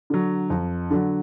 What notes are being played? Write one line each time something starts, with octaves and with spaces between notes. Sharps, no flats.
D3 F#3
F2
D3 F#3